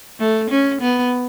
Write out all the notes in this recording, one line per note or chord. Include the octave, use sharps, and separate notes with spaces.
A3
C#4
B3